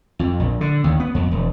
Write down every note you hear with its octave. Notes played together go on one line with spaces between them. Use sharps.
F2
A#1
D3
D#2
B3
F2
E1